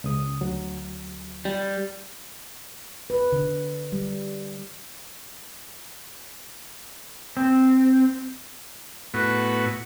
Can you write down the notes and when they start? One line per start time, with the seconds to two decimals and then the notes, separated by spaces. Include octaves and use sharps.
0.04 C#2 C#3 D#6
0.41 D2 F#3
1.45 G3
3.10 B4
3.32 D3
3.92 G3
7.37 C4
9.14 A2 B3 F#4